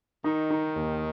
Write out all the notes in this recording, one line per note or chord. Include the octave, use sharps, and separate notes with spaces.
D#3 D#4
D#4
D#2